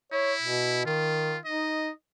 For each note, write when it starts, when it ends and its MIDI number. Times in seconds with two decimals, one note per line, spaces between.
0.12 0.82 64
0.12 0.33 73
0.42 0.85 47
0.86 1.37 51
0.86 1.38 65
1.45 1.90 63
1.45 1.92 75